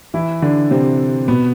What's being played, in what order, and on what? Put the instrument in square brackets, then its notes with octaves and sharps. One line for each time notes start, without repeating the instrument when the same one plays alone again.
[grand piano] E3 E4
D3 D4
C3 C4
B2 B3